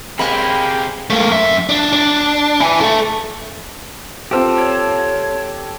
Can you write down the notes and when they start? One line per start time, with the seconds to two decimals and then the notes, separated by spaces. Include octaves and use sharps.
0.19 C3 G#3 A#3 C#4 G5 B5
1.10 A3 A#3
1.32 F#2 E5
1.69 D4
1.93 D4
2.60 E4 G#5
2.81 A4 E5
4.31 C4 F4 G4 A4 C5
4.57 C#5